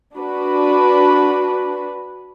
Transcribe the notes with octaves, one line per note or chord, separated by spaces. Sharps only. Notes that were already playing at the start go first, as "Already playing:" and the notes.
D4 F#4 B4